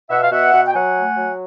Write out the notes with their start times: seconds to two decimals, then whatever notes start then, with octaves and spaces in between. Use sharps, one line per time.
0.10 B2 E5 F#5
0.21 F5
0.31 B2 E5 F#5
0.53 B2
0.66 G5
0.73 F#3 F#5 G#5
0.94 A3
1.15 F#3